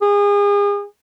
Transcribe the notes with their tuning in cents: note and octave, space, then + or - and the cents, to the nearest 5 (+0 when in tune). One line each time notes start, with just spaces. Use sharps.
G#4 -35